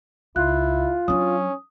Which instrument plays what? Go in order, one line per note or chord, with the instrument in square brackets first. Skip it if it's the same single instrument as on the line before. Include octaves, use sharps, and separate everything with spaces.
[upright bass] C#2 [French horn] E4 [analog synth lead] F4 [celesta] F#6
[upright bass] F#3 D4 [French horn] C#4 [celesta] D#6